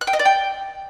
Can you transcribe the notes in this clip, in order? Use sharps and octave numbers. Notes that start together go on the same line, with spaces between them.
F#6
G5
D#5
D5
G5